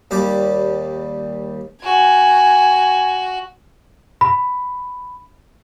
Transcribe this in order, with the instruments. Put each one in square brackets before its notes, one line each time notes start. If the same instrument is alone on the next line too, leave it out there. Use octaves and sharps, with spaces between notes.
[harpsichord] D#2 G3 D6
[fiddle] F#4 [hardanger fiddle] G#5
[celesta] B5